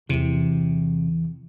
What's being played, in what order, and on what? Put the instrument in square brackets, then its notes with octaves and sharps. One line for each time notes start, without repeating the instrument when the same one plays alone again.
[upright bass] E2 E3 [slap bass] C3